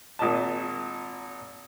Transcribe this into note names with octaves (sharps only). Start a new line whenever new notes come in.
G#1 A#2 D#5 A5